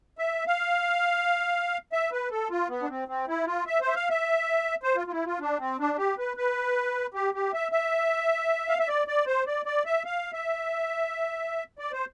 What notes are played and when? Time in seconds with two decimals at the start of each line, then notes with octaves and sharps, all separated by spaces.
0.18 E5
0.47 F5
1.93 E5
2.12 B4
2.31 A4
2.50 F4
2.69 B3
2.83 D4
2.89 C4
3.08 C4
3.28 E4
3.47 F4
3.67 E5
3.81 C5
3.88 E5
3.96 F5
4.10 E5
4.83 C5
4.96 F4
5.07 F4
5.12 E4
5.26 F4
5.40 D4
5.59 C4
5.79 D4
5.98 G4
6.18 B4
6.37 B4
7.14 G4
7.34 G4
7.54 E5
7.72 E5
8.69 F5
8.79 E5
8.88 D5
9.07 D5
9.26 C5
9.47 D5
9.66 D5
9.86 E5
10.05 F5
10.33 E5
11.79 D5
11.92 C5